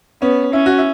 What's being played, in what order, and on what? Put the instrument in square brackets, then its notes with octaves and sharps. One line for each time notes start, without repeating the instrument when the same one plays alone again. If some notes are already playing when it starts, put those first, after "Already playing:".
[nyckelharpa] B3 [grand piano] C#4
[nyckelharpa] C#4 [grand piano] E4
[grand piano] F#4
E4